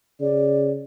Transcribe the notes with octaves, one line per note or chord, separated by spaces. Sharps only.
C#3 D5